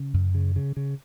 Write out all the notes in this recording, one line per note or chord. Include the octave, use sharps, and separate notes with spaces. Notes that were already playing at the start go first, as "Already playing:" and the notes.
Already playing: C#3
F#2
C#3
C#3
C#3